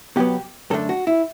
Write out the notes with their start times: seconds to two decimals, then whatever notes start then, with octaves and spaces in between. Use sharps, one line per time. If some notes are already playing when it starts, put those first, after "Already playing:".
0.16 B2 F#3 B3 G4
0.70 F#2 D3 A3 D4 A4
0.89 F#4
1.07 E4